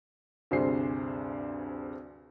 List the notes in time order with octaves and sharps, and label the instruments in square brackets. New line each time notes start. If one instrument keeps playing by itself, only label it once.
[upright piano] D2 G2 C3 G#4 C5 C7